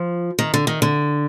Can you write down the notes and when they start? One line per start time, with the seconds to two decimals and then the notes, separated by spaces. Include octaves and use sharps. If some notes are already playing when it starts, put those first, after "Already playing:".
Already playing: F3
0.39 D#3
0.54 D3
0.67 D#3
0.82 D3